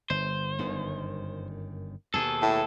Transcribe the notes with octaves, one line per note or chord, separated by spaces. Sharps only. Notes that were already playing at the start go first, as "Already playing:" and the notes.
G1 C5
G1 F#2 D#3
D#2 B2 G#4 A4
A2